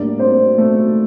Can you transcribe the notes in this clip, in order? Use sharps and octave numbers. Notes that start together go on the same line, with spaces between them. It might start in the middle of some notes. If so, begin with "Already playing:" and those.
Already playing: A2 G3 A#3 D4 D5
C4 C5
A3 A4